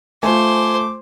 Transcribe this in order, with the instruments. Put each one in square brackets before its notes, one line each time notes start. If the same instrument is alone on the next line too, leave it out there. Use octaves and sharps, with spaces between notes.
[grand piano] A3 [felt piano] F4 G#5 [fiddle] C5 [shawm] D6